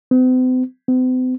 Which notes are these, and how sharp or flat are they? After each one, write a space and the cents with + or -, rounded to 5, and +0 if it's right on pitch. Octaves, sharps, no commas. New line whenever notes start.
C4 -45
C4 -45